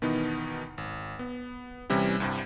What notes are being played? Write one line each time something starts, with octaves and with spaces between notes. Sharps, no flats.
B2 D#3 E3 B3 D#4
G#1
B3
C3 E3 G3 C#4 E4
C2 G2 C3